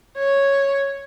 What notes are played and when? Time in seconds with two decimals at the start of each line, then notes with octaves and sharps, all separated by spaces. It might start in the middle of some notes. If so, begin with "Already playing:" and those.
0.18 C#5